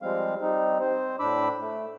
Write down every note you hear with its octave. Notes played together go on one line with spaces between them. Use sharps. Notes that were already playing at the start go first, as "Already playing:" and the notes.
F3 G3 G#3 C4 F5
G3 C4 D#4
C4 C5
A2 D4 B5 D6 E6
A3